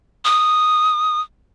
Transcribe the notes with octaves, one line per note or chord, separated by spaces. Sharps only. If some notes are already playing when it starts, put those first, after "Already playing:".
D#6